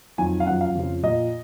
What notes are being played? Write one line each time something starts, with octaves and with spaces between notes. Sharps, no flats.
F2 D#3 F#3 G#5
F5
F#2 F3 F#5
F5
F2 C#3 F3
A#2 F3 D#5